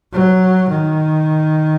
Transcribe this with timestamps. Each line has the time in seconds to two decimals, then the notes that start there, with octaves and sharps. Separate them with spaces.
0.13 F#3
0.69 D#3